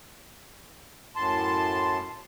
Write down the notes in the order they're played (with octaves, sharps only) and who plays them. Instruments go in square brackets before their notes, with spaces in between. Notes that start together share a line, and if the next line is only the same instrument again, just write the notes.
[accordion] F#2 A2 A5 C6